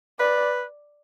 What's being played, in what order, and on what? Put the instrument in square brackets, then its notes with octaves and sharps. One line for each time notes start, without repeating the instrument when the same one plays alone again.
[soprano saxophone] B4 [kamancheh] D5